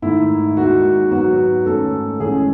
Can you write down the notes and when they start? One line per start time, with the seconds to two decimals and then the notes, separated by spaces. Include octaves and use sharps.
0.02 G#2 D#3 A3 E4
0.57 D#2 D#3 G#3 F#4
1.11 G#2 F#3 B3 F#4
1.66 G#2 D#3 A3 C#4 A4
2.20 A1 A2 G#3 C#4 G#4